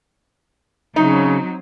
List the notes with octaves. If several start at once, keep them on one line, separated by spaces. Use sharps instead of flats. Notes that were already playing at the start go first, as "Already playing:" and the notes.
C#3 F#3 C4 D#4